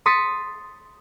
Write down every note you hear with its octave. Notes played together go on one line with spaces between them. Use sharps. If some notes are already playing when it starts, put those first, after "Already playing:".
C6 D#6 A6 B6 C#7